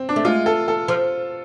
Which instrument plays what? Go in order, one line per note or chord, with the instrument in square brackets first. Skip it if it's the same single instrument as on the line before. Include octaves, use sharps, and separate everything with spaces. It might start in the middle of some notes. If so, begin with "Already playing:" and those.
Already playing: [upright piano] C4
D4
[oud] A3
[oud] G#3 [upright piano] F4
[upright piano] A4
A4
[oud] F3